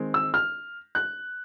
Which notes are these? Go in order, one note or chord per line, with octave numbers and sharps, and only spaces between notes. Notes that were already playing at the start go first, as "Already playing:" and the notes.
Already playing: D#3 G#3 C4
E6
F6
F#6